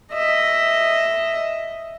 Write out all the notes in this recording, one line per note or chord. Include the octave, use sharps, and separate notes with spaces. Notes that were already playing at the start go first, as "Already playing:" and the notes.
D#5 E5